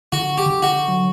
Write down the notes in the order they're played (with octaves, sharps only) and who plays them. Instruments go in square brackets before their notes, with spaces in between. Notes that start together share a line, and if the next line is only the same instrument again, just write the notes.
[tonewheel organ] D3 [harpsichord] F#4
[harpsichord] G4
[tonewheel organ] D3
[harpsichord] F#4
[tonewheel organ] F#3